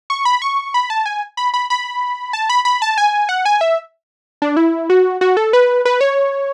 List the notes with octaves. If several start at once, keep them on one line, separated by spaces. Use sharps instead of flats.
C#6
B5
C#6
B5
A5
G#5
B5
B5
B5
A5
B5
B5
A5
G#5
F#5
G#5
E5
D4
E4
F#4
F#4
A4
B4
B4
C#5